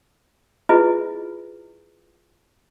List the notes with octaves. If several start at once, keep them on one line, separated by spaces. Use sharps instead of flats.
E4 F4 G#4 B4 D#5